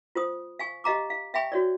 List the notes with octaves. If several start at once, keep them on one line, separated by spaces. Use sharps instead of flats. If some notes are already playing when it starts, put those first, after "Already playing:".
F4 C5 D#6
F5 G#5 C#6
G4 D#5 F5 A#5 D6
F5
E5 F5 G5 G#5 B5 C#6
F#4 C#5 D5